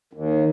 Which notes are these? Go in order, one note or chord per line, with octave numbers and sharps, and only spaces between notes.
D#2